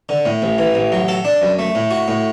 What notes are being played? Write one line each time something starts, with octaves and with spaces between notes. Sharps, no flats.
D3
A2
A1
E3
A1
F#3
A4
D4
F#2
A3
A2
F#4
A2